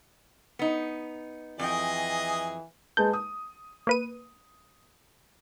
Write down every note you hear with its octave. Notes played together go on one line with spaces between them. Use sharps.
B3 D#4
F2 E3 G#4 D#5 G5
G#3 B4 A5 G6
D#6
A#3 B4 D#7